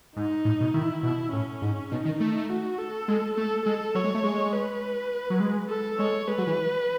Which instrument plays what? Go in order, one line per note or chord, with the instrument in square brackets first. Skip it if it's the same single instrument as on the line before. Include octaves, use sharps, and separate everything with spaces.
[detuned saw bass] G#2 [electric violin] D#4
[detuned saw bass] A2
B2
[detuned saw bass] D#3 [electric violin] E4
[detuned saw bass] B2 [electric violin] E4
[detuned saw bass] A2 [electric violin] C#4
[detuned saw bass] G#2
[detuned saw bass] B2 [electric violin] D#4
[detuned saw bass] D#3
A3
[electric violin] F#4
A4
[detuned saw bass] G#3
[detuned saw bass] A3 [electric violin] A4
[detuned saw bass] G#3 [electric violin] A4
[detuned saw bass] F#3 [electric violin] C#5
[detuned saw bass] G#3
A3
G#3
[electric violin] B4
[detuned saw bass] F#3
G#3
[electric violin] A4
[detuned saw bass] G#3 [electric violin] C#5
[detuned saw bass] G#3 [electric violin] B4
[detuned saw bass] F#3
E3